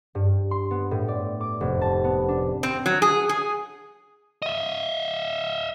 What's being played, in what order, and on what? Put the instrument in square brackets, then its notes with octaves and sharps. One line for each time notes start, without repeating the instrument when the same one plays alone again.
[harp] G2
C6
B3
A2
D5
D6
F1
A5
B3
D4
[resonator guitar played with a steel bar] C4
F#3
G#4
G#4
[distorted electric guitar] D#5 E5